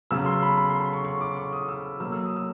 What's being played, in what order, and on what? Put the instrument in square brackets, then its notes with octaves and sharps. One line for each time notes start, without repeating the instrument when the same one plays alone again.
[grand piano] C#3 F#3 B3 E6
C6
B5
B5
C6
C6
C#6
C#6
D6
C#6
D#6
E6
B2 F#3 A#3 E6
E6
D#6
E6